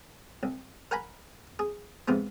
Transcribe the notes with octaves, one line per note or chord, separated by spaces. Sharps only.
C2
A#4 F#5 G#5 A#5 B5
G#4
G#2 C3 F3 B3